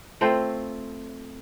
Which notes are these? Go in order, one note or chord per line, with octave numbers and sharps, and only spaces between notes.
A3 C4 F4 C5